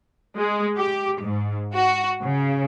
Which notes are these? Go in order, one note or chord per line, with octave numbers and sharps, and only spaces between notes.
G#3
G4
G#2
F#4
C#3